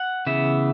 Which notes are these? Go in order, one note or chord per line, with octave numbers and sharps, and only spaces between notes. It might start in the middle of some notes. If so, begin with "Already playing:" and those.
Already playing: F#5
C#3 E3 B3 E5